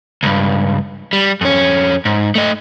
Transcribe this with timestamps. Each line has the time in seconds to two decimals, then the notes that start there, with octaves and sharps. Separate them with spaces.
0.23 C#2 G2
1.13 G3
1.41 F2 C#4
2.05 G#2
2.35 A3 D#5